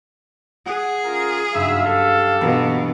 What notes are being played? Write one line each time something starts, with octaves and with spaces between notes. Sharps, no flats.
G#4 F#5 D#6 F#6
C#4 F4 A#4
F#1 G2 D#4 F#4 E5 F5
G4 A4
B2 E3 A#3 D4